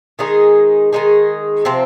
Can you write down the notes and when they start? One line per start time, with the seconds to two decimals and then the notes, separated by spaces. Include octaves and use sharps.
0.19 D#3 G#3 D#4 G#4
0.93 D#3 G#3 D#4 G#4
1.65 C3 F3 C4